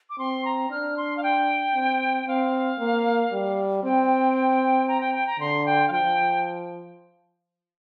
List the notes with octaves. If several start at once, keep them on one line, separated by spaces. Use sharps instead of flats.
D6
C4 C6
A#5
D4 F6
C6
F5
G5
C4
C4 F5
A#3
G3
C4 G5
A#5
G5
G5
A#5
D3 C6
G5
F5
F3 G5